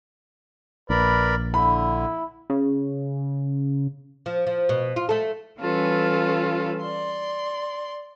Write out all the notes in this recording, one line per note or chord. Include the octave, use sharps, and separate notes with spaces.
A#1 A#4 B4 D5 B5
D3 E4 B5
C#3
F3
F3
B2
F4
A3 A4
E3 G3 C#4 F4 A4 B4
D5 C6